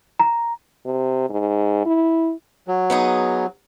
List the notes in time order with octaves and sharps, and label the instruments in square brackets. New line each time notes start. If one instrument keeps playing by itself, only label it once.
[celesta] A#5
[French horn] C3
G#2
E4
[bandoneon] F#3
[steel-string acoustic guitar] B3 D#4 G#4